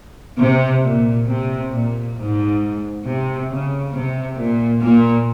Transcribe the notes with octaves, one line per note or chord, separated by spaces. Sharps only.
C3
A#2
C3
A#2
G#2
C3
C#3
C3
A#2
A#2